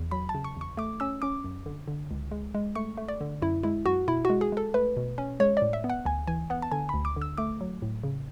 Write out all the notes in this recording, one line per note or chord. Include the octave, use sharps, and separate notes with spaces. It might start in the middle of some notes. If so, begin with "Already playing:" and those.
Already playing: E2
F#3 B5
A5
C#3
C#6
E2 C#6
A3 D6
C#4 E6
C#4 D6
F#2
D3
D3
C#2
G#3
G#3
A3 C#6
A3
D5
D3
F#2 E4
G#3 E4
F#2 F#4
B2 E4
G#3 F#4
G#4
G#3 A4
A3 B4
B2
C#4
G#3 C#5
A2 D5
E5
B3
F#5
D2 G#5
E3 G#5
B3 F#5
A5
D3 G#5
D2 B5
D6
D3
E6
A3 D6
F#3
A2
C#3